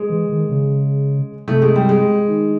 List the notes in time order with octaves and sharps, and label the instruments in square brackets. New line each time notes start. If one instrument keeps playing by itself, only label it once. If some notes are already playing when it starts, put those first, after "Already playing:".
Already playing: [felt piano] G#3
[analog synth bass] E3
D#3
C#3
[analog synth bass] C3 [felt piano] A3
[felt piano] G#3
G3
G#3
[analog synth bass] D#3